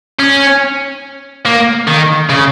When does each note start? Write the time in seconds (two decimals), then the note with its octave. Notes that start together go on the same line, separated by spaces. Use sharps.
0.19 C#4
1.46 A#3
1.88 D#3
2.30 C#3